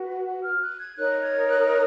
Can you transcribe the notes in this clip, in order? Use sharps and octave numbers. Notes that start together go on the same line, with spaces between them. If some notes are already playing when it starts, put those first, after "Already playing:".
Already playing: F#4 B4
F#5
F#5
F6
F#6
G#6
D#4 A#4 C#5 F#6
G#6
F#6